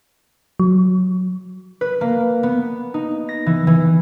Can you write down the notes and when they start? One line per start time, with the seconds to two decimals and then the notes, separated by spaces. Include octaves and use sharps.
0.60 F#3
1.81 B4
2.01 A#3
2.43 B3
2.94 D#4
3.29 A#6
3.46 E3
3.67 E3